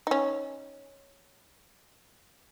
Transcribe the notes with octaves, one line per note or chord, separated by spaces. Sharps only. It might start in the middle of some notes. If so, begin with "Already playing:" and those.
C#4 D#4